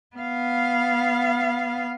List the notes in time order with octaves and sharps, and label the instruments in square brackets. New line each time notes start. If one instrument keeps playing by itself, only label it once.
[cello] B3 F5